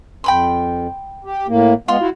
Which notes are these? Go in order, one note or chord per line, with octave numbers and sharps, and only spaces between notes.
F2 G5 B5 C6
G4
A2 A#3
G#3 B3 F4 C6
E4 F#4